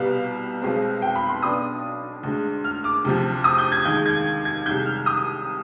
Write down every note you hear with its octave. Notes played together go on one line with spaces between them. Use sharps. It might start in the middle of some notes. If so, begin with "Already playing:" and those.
Already playing: C2 B2 G3 B3 F5
B1 B2 G#3 C4
G5
B5
C6
B1 B2 B3 D4 D#6
D2 D3 G#3
F6
D6
D2 C3 F3
D#6
G6
G#6
D#2 D#3 G#3 G6
G#6
G#6
C2 C3 D#3 G#3 G6
F6
D#6